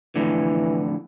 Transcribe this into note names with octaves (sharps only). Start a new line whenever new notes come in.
F2 A2 D3 E3